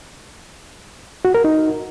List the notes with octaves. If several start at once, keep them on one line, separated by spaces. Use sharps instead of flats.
F#4
A#4
D#4